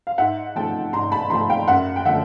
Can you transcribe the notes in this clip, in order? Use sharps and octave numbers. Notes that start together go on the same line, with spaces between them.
F5
G#2 E5 F#5
F3 A3 C4 G5 A5
G#2 A#5 C6
A5 B5
F3 A3 C4 A#5 C6
F5 G5
F#2 E5 F#5
G5
D3 F3 A3 E5 F#5